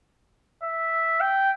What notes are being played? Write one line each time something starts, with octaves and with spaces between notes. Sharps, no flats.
E5
G5